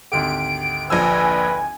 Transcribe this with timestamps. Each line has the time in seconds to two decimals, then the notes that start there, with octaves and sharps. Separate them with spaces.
0.12 G#1 D2 G4 D7
0.90 A#1 F3 B4 G#5 E6